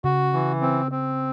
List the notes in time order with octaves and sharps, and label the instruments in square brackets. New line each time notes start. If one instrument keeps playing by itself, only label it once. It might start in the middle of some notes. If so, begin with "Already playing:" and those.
[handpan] C#3 [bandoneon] F#4
[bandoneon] E3
C4
C4